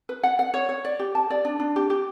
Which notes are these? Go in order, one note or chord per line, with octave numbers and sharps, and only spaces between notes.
B4
F#5
F#5
C#5
C#5
D5
G4
A5
D5
D4
D4
G4
G4